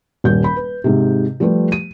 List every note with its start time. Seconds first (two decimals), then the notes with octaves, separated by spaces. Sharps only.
0.24 D#1 G3 G6
0.44 B5
0.56 B4
0.84 G#2 C3
1.40 F3 G3 A3 G4 B4
1.72 D#7